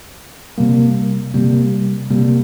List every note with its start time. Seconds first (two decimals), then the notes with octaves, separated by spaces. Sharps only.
0.58 C3 G3 A#3
1.34 C3 G3 A#3
2.11 C3 G3 A#3